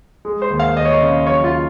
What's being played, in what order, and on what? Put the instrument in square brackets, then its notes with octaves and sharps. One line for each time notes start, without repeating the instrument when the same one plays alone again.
[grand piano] G#3
C5
D#2
F5
D#2 D#5
C#5
D#5
C#3
F#3 C#5
F4